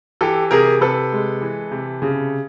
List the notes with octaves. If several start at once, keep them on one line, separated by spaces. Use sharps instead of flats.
E3 G4 A4
C3 G#4 A#4
C3 A4 B4
G#3
E3
C3
C#3